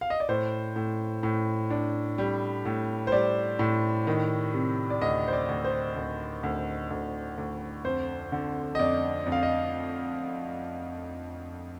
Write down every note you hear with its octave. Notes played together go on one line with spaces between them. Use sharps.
F5
D#5
D5
A2 C5
A2
A2
D4
G3
A2
C5
G3 D5
A2
D#3
C3
D5
D2 D#5
C5
D5
D2
C5
D2
D2
D2
D2
F2 C5
D3
D#5
F2 D5
F2
F5
D#5